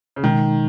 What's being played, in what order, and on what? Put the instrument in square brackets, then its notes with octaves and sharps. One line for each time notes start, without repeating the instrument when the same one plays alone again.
[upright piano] C#3
[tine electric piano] B2 G#3 D#4 [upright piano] D#3